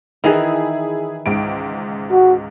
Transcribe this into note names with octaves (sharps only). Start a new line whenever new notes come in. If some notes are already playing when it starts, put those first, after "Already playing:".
D#3 E3 E4 G#4
C#2 G#2 D7
F#4